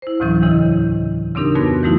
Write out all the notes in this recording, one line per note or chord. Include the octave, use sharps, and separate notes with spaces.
E4 C5
D2 A2 C3 E3 F#3 C#4
E2 C#3 E3 E4 D#5
C#3 C4 D4 D#4 G4 A#4
F2 B3 F#4 B4 C6 A#6
E3 F#3 A3 D#4 E4 F#4